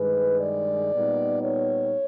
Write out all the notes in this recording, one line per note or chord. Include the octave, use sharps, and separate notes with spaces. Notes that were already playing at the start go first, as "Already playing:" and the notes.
Already playing: G2 D#3 G#3 B4
D5
A#2 G3 B3 D#4
C#5